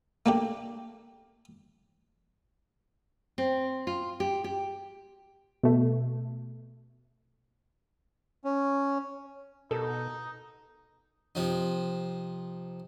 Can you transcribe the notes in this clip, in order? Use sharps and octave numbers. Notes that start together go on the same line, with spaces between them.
A3 A#3 D4 G4
C4
F4
G4
G4
B2 A3
C#4
B2 D#4 A4
C3 F3 D#4